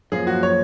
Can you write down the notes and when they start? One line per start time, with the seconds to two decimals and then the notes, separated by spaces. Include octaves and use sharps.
0.12 F#2 F3 A#3 G#4
0.27 F#4
0.43 C#5